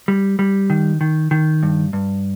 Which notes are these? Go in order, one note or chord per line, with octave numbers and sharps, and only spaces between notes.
G3
G3
D#3
D#3
D#3
G2
G2